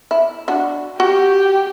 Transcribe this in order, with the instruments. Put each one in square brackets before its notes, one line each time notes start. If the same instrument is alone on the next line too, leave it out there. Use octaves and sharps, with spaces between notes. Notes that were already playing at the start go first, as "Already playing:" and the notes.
[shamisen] E4
D4 F#4
[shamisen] F#4 F#5 [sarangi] G4